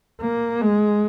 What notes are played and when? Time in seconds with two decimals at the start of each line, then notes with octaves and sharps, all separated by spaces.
0.21 A#3
0.62 G#3